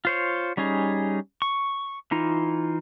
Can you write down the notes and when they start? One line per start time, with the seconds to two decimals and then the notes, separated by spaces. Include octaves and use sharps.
0.05 F4 C5 C#5
0.57 G3 C#4 D#4 G#4
1.42 C#6
2.11 E3 D#4 F4